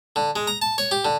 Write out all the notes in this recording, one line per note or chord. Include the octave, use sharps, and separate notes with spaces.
D3
G#3
A#5
A5
C#5
G4
D3